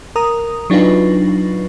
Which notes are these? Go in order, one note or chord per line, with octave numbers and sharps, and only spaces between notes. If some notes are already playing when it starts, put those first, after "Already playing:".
A#4 A#5 D#6
F#3 D4 D#4 F4 B4